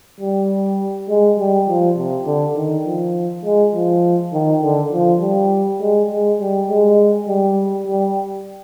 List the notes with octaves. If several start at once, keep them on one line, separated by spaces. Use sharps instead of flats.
G3
G#3
G3
F3
C3
D3
D#3
F3
G#3
F3
D#3
D3
F3
G3
G#3
G#3
G3
G#3
G3
G3